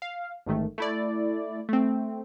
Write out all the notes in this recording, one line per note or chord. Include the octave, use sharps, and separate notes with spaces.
F5
A1 G#2 D#3 A3
A3 E4 D5
A3 C4